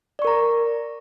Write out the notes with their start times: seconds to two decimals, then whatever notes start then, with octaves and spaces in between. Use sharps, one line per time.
0.19 D5
0.22 C#6
0.25 A#4
0.27 A#5